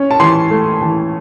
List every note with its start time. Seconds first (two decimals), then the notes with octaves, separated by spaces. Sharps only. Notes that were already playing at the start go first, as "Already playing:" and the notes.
Already playing: C#4
0.11 A5
0.20 E3 C6
0.51 A3
0.82 E3